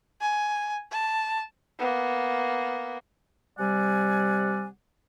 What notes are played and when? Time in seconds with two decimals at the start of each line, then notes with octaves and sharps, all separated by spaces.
0.21 G#5
0.92 A5
1.79 A#3 B3
3.58 C3 G3 D5 F#5 G#5